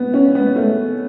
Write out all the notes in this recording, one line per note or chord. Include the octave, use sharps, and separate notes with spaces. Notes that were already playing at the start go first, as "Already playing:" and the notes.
Already playing: B3
C#4
B3
A3